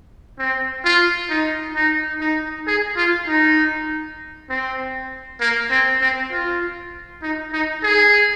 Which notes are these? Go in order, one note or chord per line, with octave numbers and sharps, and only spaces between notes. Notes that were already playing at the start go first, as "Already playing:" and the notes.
C4
F4
D#4
D#4
D#4
G#4
F4
D#4
C4
A#3
C4
C4
F4
D#4
D#4
G#4